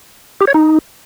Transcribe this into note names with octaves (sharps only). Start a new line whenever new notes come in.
G4
C#5
D#4